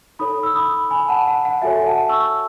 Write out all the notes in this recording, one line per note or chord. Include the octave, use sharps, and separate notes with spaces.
D#4 A4 C#5 B5 D#6
E6
B5 D#6
G#5 B5
F#5 A5
F#5
F#5
F#4 A4 C#5 E5 G#5
F#5 A5
C#6 E6